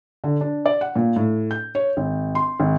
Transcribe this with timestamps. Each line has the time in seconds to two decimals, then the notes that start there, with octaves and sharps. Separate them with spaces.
0.24 D3
0.41 D4
0.66 D5
0.81 F#5
0.96 A#2
1.16 A2
1.51 G6
1.75 C#5
1.97 G#1
2.35 C6
2.60 G#1